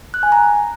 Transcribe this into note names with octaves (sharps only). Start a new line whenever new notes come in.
F#6
G#5
A#5